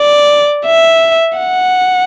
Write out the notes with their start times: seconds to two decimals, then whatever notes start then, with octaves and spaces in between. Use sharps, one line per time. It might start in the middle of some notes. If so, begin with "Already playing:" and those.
Already playing: D5
0.66 E5
1.38 F#5